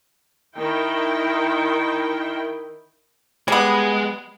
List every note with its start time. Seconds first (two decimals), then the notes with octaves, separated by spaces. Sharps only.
0.56 D#3 E4 G5
3.48 G3 G#3 B3